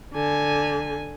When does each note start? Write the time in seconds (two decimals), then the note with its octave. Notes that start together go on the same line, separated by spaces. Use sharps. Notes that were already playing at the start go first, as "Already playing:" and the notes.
0.14 D3 G#5